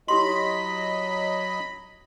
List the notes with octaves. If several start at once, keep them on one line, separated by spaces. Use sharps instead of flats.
F#3 E4 G4 D#5 B5 C6